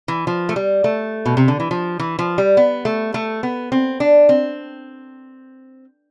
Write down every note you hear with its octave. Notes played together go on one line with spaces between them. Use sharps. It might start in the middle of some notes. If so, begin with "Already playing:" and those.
E3
F3
A3
G3
A3
B2
C3
D3
E3
F3
E3
F3
G3
B3
A3
A3
B3
C4
D4
C4